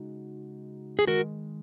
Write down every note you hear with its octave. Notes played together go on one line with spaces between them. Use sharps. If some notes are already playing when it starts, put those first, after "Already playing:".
Already playing: C#3 G#3 D#4 F#4
G#4
D#3 G#3 F#4 A#4